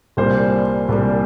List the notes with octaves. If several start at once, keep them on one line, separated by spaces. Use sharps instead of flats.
C2 A#2 G3 A#3 C5
C2 A#2 G3 A#3